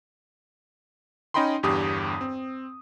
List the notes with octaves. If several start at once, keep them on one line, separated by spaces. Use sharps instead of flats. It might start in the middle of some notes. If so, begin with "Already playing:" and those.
C#4 D#4 D#5 G5 B5 C6
G1 E2 G2 G4 D#6
C4